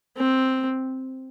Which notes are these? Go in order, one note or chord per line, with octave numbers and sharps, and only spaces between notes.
C4